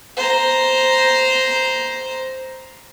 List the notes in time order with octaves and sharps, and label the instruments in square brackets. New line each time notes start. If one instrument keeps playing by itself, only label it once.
[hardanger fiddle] C5 A#5